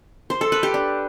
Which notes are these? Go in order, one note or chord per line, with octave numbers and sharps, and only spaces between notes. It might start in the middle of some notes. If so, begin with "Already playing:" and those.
C5
A4
B4
G4
D4